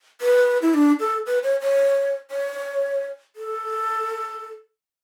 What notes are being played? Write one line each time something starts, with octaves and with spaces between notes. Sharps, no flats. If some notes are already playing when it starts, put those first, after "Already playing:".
B4
E4
D4
A4
B4
C#5
C#5
C#5
A4